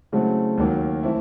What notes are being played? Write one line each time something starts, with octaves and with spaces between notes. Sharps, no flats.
C#3 F#3 A3 C4 E4
D#2 D#3 F#3 A#3
E3 A3 C4 E4